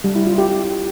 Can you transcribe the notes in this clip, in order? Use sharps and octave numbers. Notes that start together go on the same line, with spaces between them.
G3
E4
F4
G4